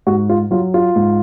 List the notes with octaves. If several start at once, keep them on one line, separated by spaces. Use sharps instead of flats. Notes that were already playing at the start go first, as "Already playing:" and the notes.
G#2 F#4
F4
F#3 F4
F4
G#2